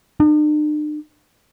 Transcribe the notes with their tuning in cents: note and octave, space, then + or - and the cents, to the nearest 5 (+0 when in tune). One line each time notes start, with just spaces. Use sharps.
D4 +45